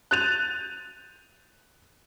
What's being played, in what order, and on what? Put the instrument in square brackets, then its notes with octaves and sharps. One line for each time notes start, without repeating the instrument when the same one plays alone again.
[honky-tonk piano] F#6 G6 A6 D#7 F7